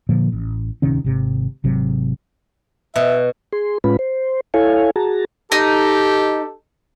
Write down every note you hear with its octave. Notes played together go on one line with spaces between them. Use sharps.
A#2 D3 F3 A#3
A1
D1 C3 D#3 C#4
G#1 C3
G#1 C3 F#3
B2 E5
G#4 C6
A2 G#3 C#4 F4 B4 B5
C5
E4 A4 C#5 F5 G#5
F#4 G#4 A5 A#5
D#4 G4 A4